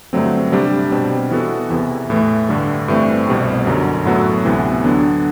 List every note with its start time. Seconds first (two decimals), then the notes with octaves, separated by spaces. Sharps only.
0.13 G2 D3 F#3 A3 C4
0.52 C3 G3 D4 G4
0.92 B2 G3 C4
1.31 E3 B3 F#4 A4
1.70 E2 C3 E3
2.10 A2 E3 A3
2.49 G2 D3 G3
2.88 G2 E3 A3 C4
3.27 C2 B2 G3 C4
3.66 F#2 D3 F#3
4.05 A2 F#3 B3 F#4 A4
4.45 D2 C3 E3 B3
4.84 D3 F#3 B3 D4